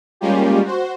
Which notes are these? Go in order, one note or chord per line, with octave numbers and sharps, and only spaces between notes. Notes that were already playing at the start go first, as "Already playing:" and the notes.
G3 G#3 A#3 C#4 F4 G4
F#4 C5